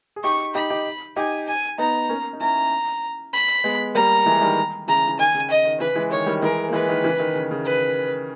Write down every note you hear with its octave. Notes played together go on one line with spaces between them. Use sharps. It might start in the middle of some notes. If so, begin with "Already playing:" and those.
G#4
D#4 G4 C#6
D#4 G4 B5
D#4 G4
D#4 G4 G#5
G#5
B3 D#4 A#5
A#3 C#4
D#4
C#4 E4 A#5
B5
G#3 B3
G3 A#3 A#5
E3 G#3
G#3
D#3 G3
C#3 E3 A#5
E3
D#3 G#5
C#3
D#5
D#3
C#3 E3 B4
E3 G#3
D#3 C#5
D#3 G3
E3 G#3 A#4
A#3
E3 G#3 B4
D#3
C#3 E3
D#3
C#3
C#3
B4